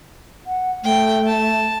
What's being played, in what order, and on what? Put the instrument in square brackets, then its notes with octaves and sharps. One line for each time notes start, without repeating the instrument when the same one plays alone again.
[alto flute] F#5
[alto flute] A3 [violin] G5
[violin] A5